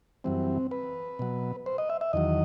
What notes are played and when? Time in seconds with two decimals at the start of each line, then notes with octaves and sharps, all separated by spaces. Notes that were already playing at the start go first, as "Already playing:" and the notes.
0.24 F#2 E3 G3 C4
0.71 B4
1.19 B2 F#3
1.66 C5
1.78 D#5
1.90 E5
2.01 E5
2.13 E2 D#3 F#3 D#5